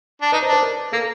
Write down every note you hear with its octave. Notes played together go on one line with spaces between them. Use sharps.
D4
D#4 B4
C5
D4 B4
A#4
A#3 A4